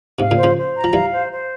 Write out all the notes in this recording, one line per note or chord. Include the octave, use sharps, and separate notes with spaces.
G#2 C3 F5
A#2 C#3
C5
C#3 F3
C5
A#5
F3
E3 G3 F5
C5
C5